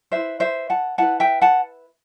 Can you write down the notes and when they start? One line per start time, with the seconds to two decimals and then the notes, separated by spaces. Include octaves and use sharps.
0.12 E4 B4 C5 E5
0.40 C5 E5
0.70 F#5 A5
0.98 E4 B4 F#5 A5
1.20 E5 G5
1.42 F#5 A5